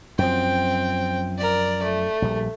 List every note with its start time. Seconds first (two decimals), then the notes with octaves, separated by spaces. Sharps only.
0.18 F#2 F3 C4 G5
1.38 A#4 D5
1.83 A3
2.22 A#1 G3